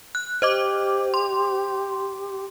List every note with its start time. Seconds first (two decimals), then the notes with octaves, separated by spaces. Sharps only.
0.15 F#6
0.42 G4 C5 D#5 D6
1.14 C6